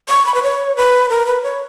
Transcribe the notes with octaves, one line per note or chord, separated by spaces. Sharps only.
C#6
B5
B4
C#5
B4
A#4
B4
C#5